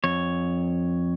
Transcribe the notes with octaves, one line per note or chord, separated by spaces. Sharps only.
F2 C#5